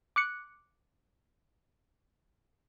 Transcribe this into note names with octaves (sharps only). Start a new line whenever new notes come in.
D6 F#6 C#7